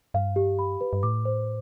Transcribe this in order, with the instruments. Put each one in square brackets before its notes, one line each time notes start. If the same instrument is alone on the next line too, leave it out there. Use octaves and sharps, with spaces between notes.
[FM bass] G2 [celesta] F5
[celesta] G4
B5
B4
[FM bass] G2
[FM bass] A2 [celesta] D6
[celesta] C5